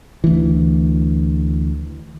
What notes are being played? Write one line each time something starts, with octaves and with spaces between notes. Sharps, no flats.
D2 E3